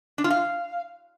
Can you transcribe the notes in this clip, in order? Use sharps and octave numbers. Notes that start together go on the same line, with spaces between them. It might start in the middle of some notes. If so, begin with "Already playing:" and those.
D4
F4
F5